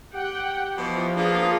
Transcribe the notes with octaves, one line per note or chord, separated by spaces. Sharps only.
G4 F#5 G5
B2 E3 F3
A#3 B3 D4 F4 G#4